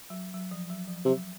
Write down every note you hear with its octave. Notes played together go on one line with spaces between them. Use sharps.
F#3
F#3
F3
F#3
F3
C3 F#3